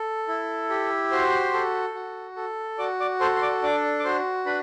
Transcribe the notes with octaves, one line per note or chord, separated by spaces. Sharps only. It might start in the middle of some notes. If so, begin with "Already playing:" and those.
Already playing: A4
E4
G4
F#4 C5 C6
A4
F#4
A4
F#4 D5 D6
D5 D6
A4 C5 C6
C6
D5 D6
D4 D5 D6
D6
F#4 C5 C6
D4 B4 B5